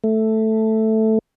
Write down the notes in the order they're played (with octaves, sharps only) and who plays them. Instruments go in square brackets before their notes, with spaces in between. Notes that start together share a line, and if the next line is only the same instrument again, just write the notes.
[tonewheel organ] A3